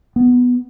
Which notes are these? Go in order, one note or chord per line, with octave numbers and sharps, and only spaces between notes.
B3